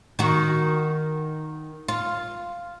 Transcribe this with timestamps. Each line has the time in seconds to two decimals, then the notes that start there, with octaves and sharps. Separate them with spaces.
0.19 D#3 F#4
1.88 F4